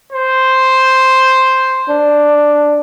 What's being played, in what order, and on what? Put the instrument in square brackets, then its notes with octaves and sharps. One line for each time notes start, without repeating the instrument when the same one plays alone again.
[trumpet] C5
[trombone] D4